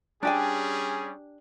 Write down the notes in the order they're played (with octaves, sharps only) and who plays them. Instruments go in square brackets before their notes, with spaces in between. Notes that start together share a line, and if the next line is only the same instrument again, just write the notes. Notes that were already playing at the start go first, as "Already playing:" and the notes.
[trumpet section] G3 C#4 G#4 [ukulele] D4 G4 G#5